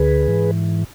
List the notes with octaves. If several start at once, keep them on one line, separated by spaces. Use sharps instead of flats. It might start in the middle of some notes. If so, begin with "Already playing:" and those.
Already playing: D2 D3 G#4 B4
G#2 E3